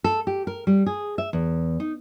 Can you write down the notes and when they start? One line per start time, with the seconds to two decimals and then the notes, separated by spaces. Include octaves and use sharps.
0.04 A4
0.27 G4
0.47 A#4
0.67 G3
0.86 G#4
1.18 E5
1.33 E2
1.80 D#4